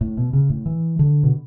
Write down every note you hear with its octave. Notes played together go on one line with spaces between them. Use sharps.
A2
B2
C#3
A2
E3
D3
B2